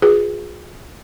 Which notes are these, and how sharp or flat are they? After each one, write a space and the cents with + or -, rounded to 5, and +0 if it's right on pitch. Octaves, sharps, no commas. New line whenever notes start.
F4 +35 G#4 +0 B4 +0